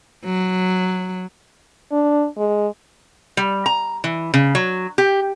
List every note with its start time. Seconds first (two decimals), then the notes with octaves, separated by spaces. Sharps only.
0.24 F#3
1.92 D4
2.38 G#3
3.37 G3
3.66 A#5
4.04 E3
4.34 C#3
4.55 F#3
4.98 G4